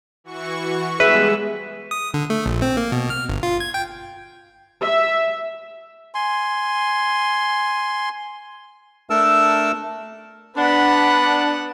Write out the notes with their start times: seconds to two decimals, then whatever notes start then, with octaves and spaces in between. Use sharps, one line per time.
0.24 E3 F#4 C#6
1.00 G3 G#3 B3 G#4 B4 E5
1.91 D#6
2.14 D3
2.30 A3
2.46 A#1
2.62 C4
2.77 A#3
2.92 B2
3.10 F6
3.29 G1
3.43 F4
3.60 G#6
3.74 G5
4.82 E5
6.14 G#5 C6
9.10 A3 D4 A4 A#4 A5 E6
10.57 B3 D4 F#5 B5